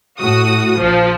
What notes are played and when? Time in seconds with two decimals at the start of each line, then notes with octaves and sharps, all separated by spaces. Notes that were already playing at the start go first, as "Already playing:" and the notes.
0.19 A2 F#4 D#6
0.79 A#1 F3